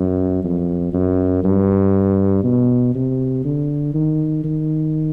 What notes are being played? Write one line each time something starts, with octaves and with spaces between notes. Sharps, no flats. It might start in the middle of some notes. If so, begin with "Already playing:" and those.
Already playing: F#2
F2
F#2
G2
B2
C3
D3
D#3
D#3